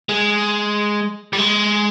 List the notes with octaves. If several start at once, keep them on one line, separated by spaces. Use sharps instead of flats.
G#3
G3
G#3